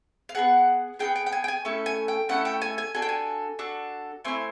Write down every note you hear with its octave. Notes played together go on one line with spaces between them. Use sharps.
F5
B3 D#4 G#4 F#5
B3 D#4 G#4 G5
G5
G5
G#5
G5
G#5
A3 C#4 E4 A4
G#5
G5
A3 C#4 E4 A4 F#5
G5
G#5
G#5
D4 F#4 A4 G#5
G5
G#5
D4 F#4 A4
A3 C4 E4 G#5